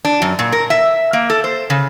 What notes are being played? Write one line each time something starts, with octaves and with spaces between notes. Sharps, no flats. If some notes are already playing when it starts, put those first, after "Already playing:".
D4
F#2
A#2
A#4
E5
A#3
A4
C5
C#3